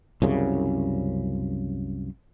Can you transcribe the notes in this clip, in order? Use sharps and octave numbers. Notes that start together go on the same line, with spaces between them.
C2 F#2 C#3